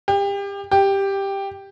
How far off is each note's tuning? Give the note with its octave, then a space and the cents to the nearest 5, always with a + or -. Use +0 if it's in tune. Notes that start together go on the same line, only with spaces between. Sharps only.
G4 +30
G4 +5